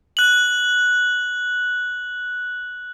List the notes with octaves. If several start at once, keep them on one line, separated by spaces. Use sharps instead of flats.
F#6 F#7